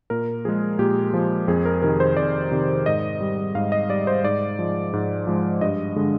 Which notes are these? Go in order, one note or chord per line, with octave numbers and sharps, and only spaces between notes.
A#2 A#4
F3 G#3 G#4
A#2 G4
F3 G#3
F2 G#4
A#4
C3 D#3 A#4
C5
F2 D5
C3 D#3
G#2 D#5
G3
G#2 F5
D#5
G3 D5
C5
G#2 D5
F3 G#3
G#2
F3 G#3
G2 D#5
D3 G#3